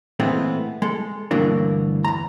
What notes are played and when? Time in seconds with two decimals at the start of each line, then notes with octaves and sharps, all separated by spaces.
0.20 A#2 E3 G#3 A3 B3 C4
0.82 G#3 A4
1.31 D2 G2 B2 E3 A#3 D4
2.05 E2 A#5